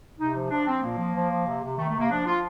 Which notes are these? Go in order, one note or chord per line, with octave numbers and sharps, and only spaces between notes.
C3 D#4
F3
F3 D4
F3 C4
A#2 A#3
F3
F3
F3
C3
C3
D#3 A3
A3
C3
A#3
F3 D4
F3 F4